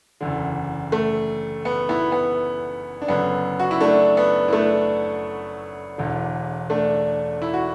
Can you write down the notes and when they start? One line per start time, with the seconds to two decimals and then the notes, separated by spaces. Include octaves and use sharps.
0.21 F#1 E2 D3
0.92 A3
1.65 B3
1.89 B3 E4
2.12 B3
3.02 D4
3.08 F#1 F#2 D3 B3
3.60 F#4
3.71 E4
3.81 A3 D4
4.17 B3
4.48 E4
4.53 A3 D4
5.98 E1 E2 D3
6.70 A3 D4
7.42 E4
7.54 F#4